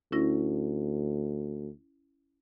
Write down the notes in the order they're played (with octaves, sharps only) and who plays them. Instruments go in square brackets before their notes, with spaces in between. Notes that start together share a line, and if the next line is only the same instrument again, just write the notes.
[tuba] D2 [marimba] C#4 E4 A#6